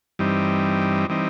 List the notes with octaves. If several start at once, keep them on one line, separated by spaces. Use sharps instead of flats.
G2 E3 G3 C4 D#4
E3 G3 C4 D#4